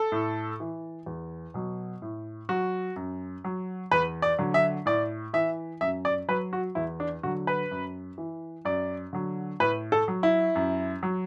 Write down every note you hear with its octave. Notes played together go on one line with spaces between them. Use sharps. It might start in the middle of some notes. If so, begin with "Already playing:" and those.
Already playing: A4
A2
E3
E2
B2 F#3
A2
F#3 F#4
F#2
F#3
E2 B4
D5
D3 F#3
E5
A2 D5
E3 E5
F#2 E5
D5
F#3 B4
F#4
E2 E4
D4
D3 F#3 F#4
B4
F#2
E3
F#2 D5
D3 F#3
A2 B4
A4
F#3
E4
F#2
F#3